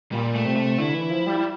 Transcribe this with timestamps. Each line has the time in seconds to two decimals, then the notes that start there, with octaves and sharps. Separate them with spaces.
0.12 A#2 G3
0.35 A3
0.45 C3
0.56 A3
0.78 D3 E4
0.95 E3
1.11 F3
1.27 G3
1.39 G3